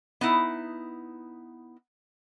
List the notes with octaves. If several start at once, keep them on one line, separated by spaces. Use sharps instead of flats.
B3 D#4 E4